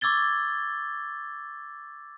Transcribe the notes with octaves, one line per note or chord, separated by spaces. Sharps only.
C#6 D6 E6 G#6 A6 G7